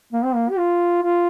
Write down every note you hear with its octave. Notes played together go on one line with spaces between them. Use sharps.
A#3
C4
A#3
G4
F4
F4